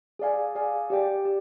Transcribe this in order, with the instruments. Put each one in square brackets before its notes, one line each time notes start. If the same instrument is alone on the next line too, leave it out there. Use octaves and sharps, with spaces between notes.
[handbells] G#4 D5 F5 G#5
G#4 D5 F5 G#5
G4 D5 G5
G4